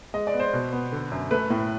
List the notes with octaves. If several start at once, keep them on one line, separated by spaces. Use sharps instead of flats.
G#3 D#5
D5
B3
C5
B2
B3
D3
F#2
A3 B4
A2